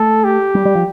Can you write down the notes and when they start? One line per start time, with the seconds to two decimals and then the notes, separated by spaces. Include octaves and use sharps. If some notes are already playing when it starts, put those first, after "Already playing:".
Already playing: A3 A4
0.24 G4
0.55 G3
0.65 G3
0.75 F3